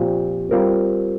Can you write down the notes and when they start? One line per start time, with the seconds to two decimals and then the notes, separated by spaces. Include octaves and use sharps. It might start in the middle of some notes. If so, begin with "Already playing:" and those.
Already playing: A#2 F3 C4 G4
0.51 G3 C4 F4 A#4